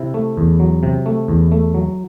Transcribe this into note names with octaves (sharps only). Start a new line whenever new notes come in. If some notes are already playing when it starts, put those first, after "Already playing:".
Already playing: C3 E4
A3
E2
F#3
C3
A3
E2
A3
F#3